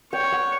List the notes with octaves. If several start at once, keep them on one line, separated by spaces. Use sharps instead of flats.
C#5 G5
F#5